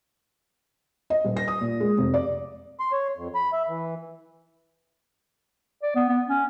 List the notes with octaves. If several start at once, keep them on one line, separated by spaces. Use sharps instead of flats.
D#5
D#1
A#6
D#6
A#2
G#3
F1
D5
C6
C#5
F2
B5
E5
E3
D5
B3
B3
C#4